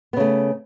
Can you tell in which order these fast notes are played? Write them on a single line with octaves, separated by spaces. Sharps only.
B3 C#3 A3